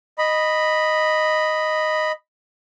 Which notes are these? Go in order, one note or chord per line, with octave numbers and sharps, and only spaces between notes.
D#5 B5